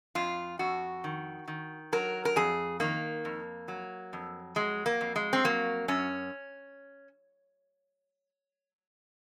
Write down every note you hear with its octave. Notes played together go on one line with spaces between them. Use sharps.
F2 F4
F2 F#4
D#3
D#3
F#3 A#4
A#4
F2 G#4
D#3 A#3
F2
F#3
F2
F#3 G#3
A#3
F2
G#3
C4
F#3 A#3
F#2 C#4